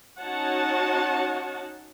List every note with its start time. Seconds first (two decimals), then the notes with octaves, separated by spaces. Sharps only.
0.20 C#4 D#4 F#4 C#5 F#5 A5